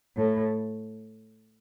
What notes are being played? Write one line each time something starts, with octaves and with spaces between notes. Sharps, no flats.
A2